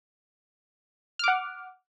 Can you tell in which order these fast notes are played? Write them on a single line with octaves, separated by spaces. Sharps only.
F6 D6 F#5